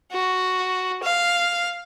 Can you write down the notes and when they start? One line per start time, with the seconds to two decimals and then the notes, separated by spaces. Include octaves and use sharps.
0.12 F#4
1.03 F5